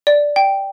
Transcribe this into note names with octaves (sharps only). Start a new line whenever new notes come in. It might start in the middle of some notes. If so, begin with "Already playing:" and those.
D5
G5